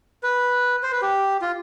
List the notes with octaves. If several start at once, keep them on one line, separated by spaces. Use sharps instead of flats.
B4
C5
B4
G4
F4